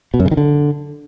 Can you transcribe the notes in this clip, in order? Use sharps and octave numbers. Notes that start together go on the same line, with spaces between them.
B2
F#2
C#3
D#3
D3